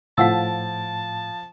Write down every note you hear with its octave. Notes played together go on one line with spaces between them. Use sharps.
A2 F3 F5 F#5 A5 E6